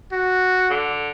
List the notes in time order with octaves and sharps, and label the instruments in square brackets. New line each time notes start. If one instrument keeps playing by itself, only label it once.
[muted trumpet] F#4
[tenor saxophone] D3